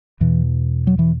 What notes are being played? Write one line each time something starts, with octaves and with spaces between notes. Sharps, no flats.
E2 B2 E3
F#3
E3